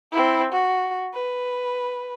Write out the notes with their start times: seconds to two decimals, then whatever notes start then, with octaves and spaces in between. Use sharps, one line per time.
0.12 C4 E4
0.53 F#4
1.14 B4